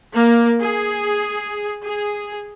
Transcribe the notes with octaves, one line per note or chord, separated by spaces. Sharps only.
A#3
G#4
G#4